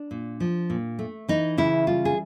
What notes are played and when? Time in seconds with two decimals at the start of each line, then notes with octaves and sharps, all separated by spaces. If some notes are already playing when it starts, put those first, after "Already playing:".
Already playing: D4
0.11 A#2
0.40 F3
0.70 A#2
0.99 A3
1.28 E3 D#4
1.58 C#3 E4
1.87 G3 F4
2.05 G#4